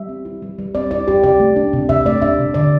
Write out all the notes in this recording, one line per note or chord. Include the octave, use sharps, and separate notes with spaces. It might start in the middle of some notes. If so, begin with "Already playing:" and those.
Already playing: G3 E5
C4
E4
G3
G3
C4 D5
E4 D5
G3 G4
C3 D5
A3
D4
C3
C3 E5
A3 D5
D4 E5
C3
D3 D5